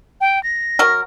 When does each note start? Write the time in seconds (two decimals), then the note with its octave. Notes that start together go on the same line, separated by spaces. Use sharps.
0.21 G5
0.43 A#6
0.79 F#3 A#4